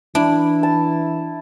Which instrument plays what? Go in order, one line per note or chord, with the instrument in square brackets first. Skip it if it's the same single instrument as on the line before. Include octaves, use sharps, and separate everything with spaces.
[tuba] E3 [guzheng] D4 [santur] E4
[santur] A5